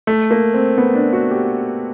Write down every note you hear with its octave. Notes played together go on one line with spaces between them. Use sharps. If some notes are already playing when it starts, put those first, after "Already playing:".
A3
A#3
C4
B3
D4
F#4
G4